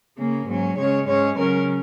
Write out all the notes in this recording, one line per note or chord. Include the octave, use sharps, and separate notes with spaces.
C#3 A#3 C#4
G#2 F#3 C#4
C#3 G#3 C#4 C#5
G#2 G#3 C#4 C#5
C#3 F#3 C#4 A#4